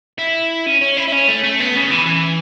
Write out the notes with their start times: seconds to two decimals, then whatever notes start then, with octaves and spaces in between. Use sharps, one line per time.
0.19 E4
0.66 C#4
0.81 C#4
0.97 E4
1.08 E4
1.12 C#4
1.28 A3
1.44 A3
1.60 B3
1.75 C#3
1.91 E3
2.06 E3